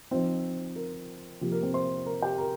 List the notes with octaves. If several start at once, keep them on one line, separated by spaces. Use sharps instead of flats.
F3 C4 D#4 C5
A#4
C3 F3 A#3 F4 G4
A#4
C4 C5
C5 C6
A#4 A#5
G4 G5
A#4 A#5